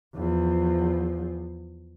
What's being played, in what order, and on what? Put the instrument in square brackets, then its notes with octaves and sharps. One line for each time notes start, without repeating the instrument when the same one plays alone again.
[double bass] E2 F3